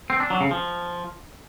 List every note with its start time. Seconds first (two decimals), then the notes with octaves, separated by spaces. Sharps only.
0.10 C4
0.20 D4
0.30 F#3
0.41 C#3
0.51 F3